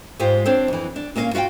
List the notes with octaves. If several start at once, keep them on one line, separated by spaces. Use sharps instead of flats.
G#2 G#3 F4 G4 C5
C4 D4 C5 C#5
F2 E3
D4
A#2 A#3 C#4 B4 F5
F4 F#4 E5 F5 G5